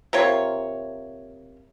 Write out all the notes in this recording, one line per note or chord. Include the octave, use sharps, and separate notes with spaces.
C3 A#3 F4 C#5